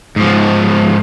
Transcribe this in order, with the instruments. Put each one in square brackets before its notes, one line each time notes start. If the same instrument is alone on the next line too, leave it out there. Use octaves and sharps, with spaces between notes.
[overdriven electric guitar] G#2 F3